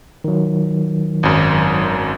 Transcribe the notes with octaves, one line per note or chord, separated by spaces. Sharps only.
D#3 F#3
G#1 F#2